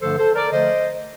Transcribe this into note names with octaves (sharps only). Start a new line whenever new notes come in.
G2 D3 F3 A3 A4 C5
A4 C5
A#4 D5
D3 F3 A3 C5 D#5